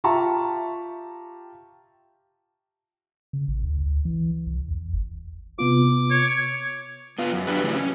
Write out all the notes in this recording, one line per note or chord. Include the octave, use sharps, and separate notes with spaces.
F4 G4 E5 A5 A#5 C#6
C#3
A1
D2
D2
E3
C2
E2
G1
C3 B3 F4 D6
C#5
B3 F4
F#2
F#3 D4 G4 B4
A2 C#3 E3 E4 F#4
C#4